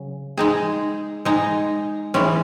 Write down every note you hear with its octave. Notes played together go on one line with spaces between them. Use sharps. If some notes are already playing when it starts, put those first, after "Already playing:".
Already playing: C#3 F#3
G#3 D#4 G#4
G#3 D#4 G#4
E3 G#3 C#4